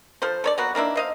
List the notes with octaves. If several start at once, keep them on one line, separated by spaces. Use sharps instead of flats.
F3 A4 C5
A4 C#5 D5
F#3 A#3 B3 F#4
D#3 A#3 D4 E4
C5 D#5 F5